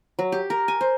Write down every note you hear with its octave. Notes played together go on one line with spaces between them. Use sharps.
F#3
G4
A#4
G#5
C5